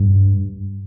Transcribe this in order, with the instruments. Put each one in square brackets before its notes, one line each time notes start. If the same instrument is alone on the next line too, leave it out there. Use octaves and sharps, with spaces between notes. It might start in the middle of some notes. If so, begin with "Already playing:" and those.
Already playing: [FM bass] G2